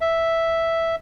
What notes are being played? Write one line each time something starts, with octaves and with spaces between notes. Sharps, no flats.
E5